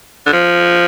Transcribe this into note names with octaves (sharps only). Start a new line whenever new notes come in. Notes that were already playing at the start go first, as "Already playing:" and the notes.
D3
F3